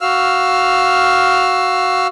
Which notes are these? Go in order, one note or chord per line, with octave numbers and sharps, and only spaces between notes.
F#4 F5 E6 F6